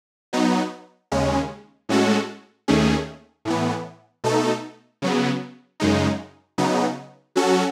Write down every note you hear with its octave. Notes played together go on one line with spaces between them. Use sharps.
F#3 B3 D#4
D#2 C#3 G#3 C#4
A2 G#3 C#4 F#4 A4
D#2 D#3 A3 C#4 G#4
A2 E3 B3
B2 A3 D#4 A4
C#3 F#3 B3
F#2 C#3 G#3 D#4
C#3 F#3 B3 D#4
F#3 C#4 F#4 A4